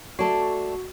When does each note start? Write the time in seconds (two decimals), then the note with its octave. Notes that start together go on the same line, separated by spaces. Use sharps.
0.19 A3 F#4 A4 D5